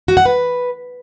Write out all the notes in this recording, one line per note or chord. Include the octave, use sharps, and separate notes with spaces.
F#4
F#5
B4